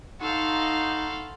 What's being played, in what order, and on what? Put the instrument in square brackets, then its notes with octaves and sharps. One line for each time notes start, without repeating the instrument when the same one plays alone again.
[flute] D#4 [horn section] F#4 B5 C6 [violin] A4 F5